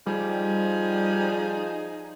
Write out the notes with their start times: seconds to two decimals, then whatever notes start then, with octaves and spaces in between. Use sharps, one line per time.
0.06 F3 G3 D#4 G#4